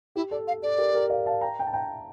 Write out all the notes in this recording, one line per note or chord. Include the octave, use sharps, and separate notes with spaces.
E4 G4
A4 D5
F5
A4 D5
G4 A#4
G4 A#4
D5 F5
F5 A5
G5 A#5
G5
A5
G5 A#5